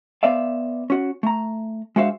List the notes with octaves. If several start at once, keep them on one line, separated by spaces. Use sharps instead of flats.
B3 C5 D5 E5 F5
C#4 F#4
A3 A#5
G#3 D4 F#4 C5 E5 F5